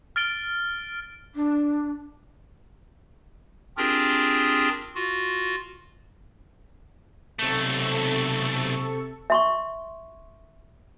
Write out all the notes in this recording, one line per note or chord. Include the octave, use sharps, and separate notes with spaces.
F6 A6 D7 G7
D4
C4 D4 F4 G4 G#4 A#4
F4 F#4
B1 C3 A3 A4 C#6
E5 C6 C#6